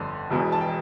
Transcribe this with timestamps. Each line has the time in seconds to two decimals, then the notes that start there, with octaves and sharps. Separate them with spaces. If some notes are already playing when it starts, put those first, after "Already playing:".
Already playing: G1 F2 D3
0.30 E1 E2 B2
0.52 A5
0.61 G5